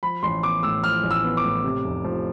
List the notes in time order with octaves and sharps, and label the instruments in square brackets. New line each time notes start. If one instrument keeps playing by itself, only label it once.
[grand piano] F3 B5
A1 C6
B3 D6
A2 E6
F3 F6
A1
E6
B3
D6
A2
C3
F1
F3